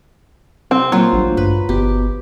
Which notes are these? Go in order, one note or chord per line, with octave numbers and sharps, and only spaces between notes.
C3 C4
A#2 F#3 A#3 F4 C5
A1 G2
D2
G2 B4
G1 B2 G4